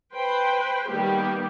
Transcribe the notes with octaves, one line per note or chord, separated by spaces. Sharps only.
B4 C5 G5
D#3 G3 A#3 B3 G4